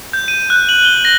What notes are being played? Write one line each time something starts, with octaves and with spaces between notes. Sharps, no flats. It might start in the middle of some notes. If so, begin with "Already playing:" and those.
G6
D#7
F#6
F#7
G7
A#6